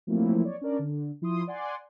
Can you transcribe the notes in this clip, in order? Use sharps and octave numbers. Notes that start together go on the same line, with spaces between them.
F3 F#3 A3 A#3 C4 E4
C#5 D5
C#4 D4 A#4 D5
D3
F3 E4 C6 D#6
D5 F#5 G#5 C6